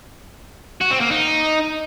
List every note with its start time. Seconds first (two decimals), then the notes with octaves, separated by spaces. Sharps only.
0.81 F#4
0.91 C4
1.00 A#3
1.10 D#4